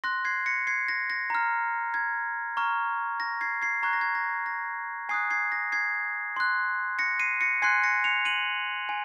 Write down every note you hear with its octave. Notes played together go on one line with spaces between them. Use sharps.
C6 F#6 A#6
G#6 C7
A#6 C#7
G#6 C7
A#6
A#6
A#5 F6
G#6
A#5 C#6 F6
A#6
G#6 C7
G#6 C7
A#5 C#6 F#6 G#6
A#6
G#6
A#6
A#6
G#5 D#6 F#6 G#6 C7
G#6 C7
A#6
G#6 C7
C6 F#6
A#6 C#7
C7 D#7
A#6 C#7
G#5 C6 F#6 G#6 C7
A#6 C#7
C#7 F7
D#7 F#7
G#5